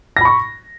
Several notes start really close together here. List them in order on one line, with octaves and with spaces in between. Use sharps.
A#6 B5 C#6